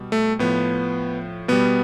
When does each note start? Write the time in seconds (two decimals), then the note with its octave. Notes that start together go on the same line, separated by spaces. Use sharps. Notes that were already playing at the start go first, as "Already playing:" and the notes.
Already playing: B2 G3
0.12 A3
0.39 A2 F3 B3
1.48 B2 G3 B3